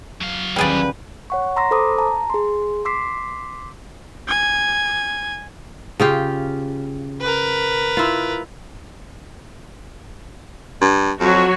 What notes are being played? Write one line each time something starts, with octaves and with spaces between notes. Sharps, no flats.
F#3 F5
D#1 G3 G4 G#4 B4 D5
C#5 F#5 C#6
A#5 C6 E6 A#6
A4 C5 B5 D6 D#6
A5 A#5
G#4 C6
C6 D6 E6 B6 C7
G#5
C#3 F4 G4
A#4 B4
E4 F4
G2
F2 F#3 F#4 C#5